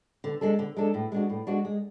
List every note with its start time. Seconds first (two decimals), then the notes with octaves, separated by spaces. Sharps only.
0.24 D3
0.41 G#3 D4 A4
0.59 D3
0.77 G#3 D4 A4
0.94 A2
1.12 G#3 D4 F#4
1.30 A2
1.47 G#3 D4 F#4
1.65 G#3